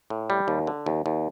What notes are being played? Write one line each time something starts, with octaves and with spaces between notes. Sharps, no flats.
A2
G3
D#2
D3
D#2
D#2